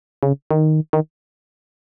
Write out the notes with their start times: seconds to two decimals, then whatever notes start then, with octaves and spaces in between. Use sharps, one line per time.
0.23 C#3
0.51 D#3
0.93 D#3